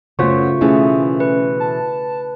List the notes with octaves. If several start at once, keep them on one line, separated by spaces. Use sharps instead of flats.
F#2 C#3 F#3 A3 B3 F4 C5 C#6
B2 E3 A3 C#4 E4 G#4
B4
A5